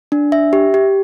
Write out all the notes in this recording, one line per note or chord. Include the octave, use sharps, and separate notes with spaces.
D4
E5
G4
G4